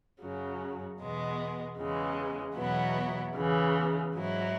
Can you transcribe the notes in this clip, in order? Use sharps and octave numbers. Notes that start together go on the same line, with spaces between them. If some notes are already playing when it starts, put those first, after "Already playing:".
F#2 C#3 F#3
E2 B2 G#3 B3
E2 C#3 E3 G#3
E2 B2 F#3 B3 E4
E2 C#3 E3
G#2 F#3 E4